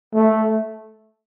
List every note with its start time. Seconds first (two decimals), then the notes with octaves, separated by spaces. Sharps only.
0.15 A3